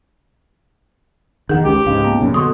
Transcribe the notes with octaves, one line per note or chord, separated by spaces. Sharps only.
E2 D#3 G#4 F#5
C#2 G4
C#2 G#2 F5
A#3 B3
F#2 A#2 C#3
B2 D3 C6 C#6 D#6